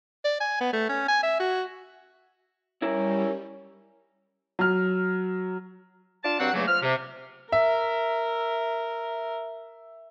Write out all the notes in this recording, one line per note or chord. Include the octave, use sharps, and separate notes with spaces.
D5
G#5
B3
A3
C#4
G#5
E5
F#4
G3 C#4 E4 A#4
F#3 F6
D4 F4 A5
G2 F#3 C4 F#5
E2 C#3 F#3 A3 A#3
F3 F6
C3
A#4 E5